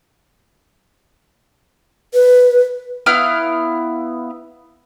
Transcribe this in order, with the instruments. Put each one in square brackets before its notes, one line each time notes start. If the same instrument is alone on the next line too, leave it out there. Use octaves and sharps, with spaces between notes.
[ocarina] B4
[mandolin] B3 E4 F5 F6